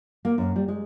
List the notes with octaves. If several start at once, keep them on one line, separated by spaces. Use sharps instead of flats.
A#3
F#2
G3
G#3